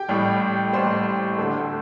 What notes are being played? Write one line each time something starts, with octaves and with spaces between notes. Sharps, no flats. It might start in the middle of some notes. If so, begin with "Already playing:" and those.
Already playing: G4 G5
A1 A2 G3
A1 A2 G3 C5 C6
D2 D3 A3